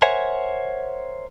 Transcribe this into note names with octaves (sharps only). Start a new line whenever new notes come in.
A#4 C5 C#5 E5 F#5 G#5